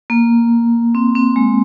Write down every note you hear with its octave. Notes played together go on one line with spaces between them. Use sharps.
A#3
C4
C4
G#3